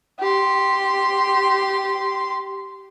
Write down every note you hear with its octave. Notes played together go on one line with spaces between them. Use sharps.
G4 C6